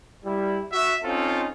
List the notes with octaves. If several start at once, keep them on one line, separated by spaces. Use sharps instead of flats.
G3 E4
F#4 E5
C4 C#4 D#4 F4 A4